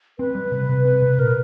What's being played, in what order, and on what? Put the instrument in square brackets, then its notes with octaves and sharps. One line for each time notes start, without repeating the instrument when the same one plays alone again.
[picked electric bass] C4 [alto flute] B4
[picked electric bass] G3
C3
C3
C4
C3
[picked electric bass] A#2 [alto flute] A#4